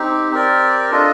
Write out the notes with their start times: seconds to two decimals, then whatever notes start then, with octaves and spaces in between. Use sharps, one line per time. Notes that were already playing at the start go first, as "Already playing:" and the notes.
Already playing: C4 D#4 G4
0.32 C4 G4 A#4 D5
0.91 D4 F4 A4 D#5